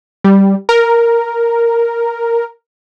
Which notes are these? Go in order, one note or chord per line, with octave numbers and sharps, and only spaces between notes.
G3
A#4